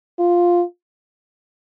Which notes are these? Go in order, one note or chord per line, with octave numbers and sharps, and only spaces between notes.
F4